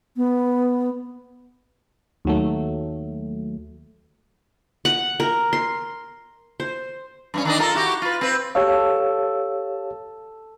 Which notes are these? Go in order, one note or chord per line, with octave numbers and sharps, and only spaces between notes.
B3
D#2 F#3 A3
F#5
A#4
C6
C5
G2 E3 C#4
D#3 D4 D#5
F4 A4 A#4
E4 F#4 G4
F4 B4
C4 B4
G4 A4 C#5 F5